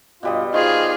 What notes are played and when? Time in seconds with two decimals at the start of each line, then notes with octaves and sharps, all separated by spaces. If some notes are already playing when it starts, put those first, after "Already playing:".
0.23 G2 B2 G3 F4 D#5
0.54 D#3 F4 G#4 C5 D#5 G#5 C#6